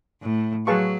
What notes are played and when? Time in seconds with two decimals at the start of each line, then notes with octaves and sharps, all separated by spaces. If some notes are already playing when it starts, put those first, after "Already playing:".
0.21 A2
0.67 F#3 G#4 B4 F5 A5 C#6